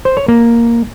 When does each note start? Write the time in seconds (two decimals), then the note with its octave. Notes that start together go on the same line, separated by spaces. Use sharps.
0.05 C5
0.17 C#5
0.28 A#3